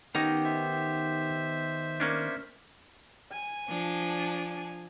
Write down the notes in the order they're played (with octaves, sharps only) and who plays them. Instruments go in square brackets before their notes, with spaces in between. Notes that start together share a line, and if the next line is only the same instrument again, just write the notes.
[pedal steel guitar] D#3 B3 G4 [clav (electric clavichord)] C#4 D#4 A#5
[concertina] C5 E5
[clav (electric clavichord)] A#3 C#4 D4
[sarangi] G#5
[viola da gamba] F3 [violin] D4